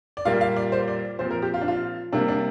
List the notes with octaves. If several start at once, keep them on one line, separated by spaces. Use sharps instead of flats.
D5
A#2 G3 A#3 F5
F5
D5
C5
D5
A#2 F3 C4 C5
A#4
G4
F4
D4
F4
C3 G3 A#3 D4
D4